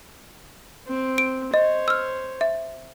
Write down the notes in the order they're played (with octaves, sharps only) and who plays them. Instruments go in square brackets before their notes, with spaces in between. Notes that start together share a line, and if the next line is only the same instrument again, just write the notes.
[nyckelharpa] C4
[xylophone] D7
[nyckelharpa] C5 C#5 [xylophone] D#5
[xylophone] E6 F6
E5